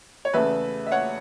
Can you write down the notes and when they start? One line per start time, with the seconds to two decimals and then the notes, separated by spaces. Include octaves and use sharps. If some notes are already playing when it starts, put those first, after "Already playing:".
0.25 C#5
0.33 E2 C#3 A3 B4 E5
0.86 E5
0.91 C#5 F#5